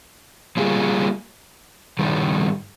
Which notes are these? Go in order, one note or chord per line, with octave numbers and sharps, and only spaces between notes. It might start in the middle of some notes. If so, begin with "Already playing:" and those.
G3 A#3 F4 G#4
G2 D#3 G3